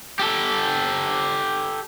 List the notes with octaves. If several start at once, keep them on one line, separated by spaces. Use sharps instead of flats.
G4 A4